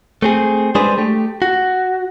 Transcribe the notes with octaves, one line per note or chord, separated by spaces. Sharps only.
A3 C4 G#4
G3 G#3 D4 G#4 B4 C5
A3 G4
F#4